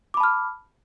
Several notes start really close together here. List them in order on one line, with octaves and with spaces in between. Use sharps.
D6 B5 A5 F6